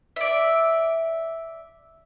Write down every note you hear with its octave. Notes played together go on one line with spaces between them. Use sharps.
D5 E5